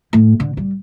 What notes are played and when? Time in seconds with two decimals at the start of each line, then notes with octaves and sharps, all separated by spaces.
0.13 A2
0.40 D3
0.57 G3